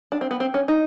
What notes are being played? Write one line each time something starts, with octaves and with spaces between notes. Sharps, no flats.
D4
C4
B3
C4
C#4
D#4